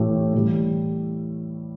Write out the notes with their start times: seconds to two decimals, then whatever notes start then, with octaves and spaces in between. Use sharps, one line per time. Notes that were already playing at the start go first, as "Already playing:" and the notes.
Already playing: A2 E3 A3 E4 G4
0.34 A2 E3 G3